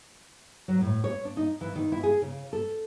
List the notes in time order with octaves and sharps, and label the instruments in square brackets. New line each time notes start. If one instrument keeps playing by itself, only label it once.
[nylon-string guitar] F#3
A2
C#5
D4
D#4
E3
D#3
E4
G#4
C#3
A4